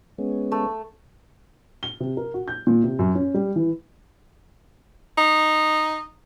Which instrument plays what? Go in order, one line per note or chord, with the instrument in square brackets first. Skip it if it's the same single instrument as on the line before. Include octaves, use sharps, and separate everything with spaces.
[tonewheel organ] G#3 B3 C#4
[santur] A3
[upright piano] G7
C3
A#4
F#4
G6
A#2
C3
F#2
C#4
G3
E3
[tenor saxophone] D#4